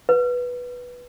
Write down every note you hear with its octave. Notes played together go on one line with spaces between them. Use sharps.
B4